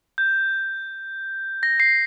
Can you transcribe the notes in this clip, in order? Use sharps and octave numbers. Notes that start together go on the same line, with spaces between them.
G6
A#6
C7